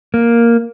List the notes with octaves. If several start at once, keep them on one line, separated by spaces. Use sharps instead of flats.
A#3